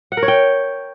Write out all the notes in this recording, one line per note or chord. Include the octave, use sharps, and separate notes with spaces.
F#5
A#4
C#5
G5